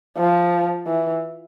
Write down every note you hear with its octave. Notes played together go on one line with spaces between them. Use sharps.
F3
E3